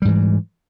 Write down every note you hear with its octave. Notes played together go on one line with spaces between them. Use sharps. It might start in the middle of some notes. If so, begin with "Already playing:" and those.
G#2 E3 G3